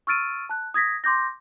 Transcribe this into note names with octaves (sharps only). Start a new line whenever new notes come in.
C#6 E6 F6 A6 D7 D#7
A5 F#6
D#6 G#6 A#6 B6
C6 D6 G6 A#6